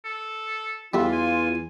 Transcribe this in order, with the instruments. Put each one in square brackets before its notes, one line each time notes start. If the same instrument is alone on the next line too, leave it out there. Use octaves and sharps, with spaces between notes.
[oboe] A4
[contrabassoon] E2 [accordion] E3 F4 [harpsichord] G3 A3 F#4 [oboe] E5
[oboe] G#5